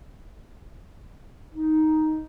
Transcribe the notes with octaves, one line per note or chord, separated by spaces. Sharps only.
D#4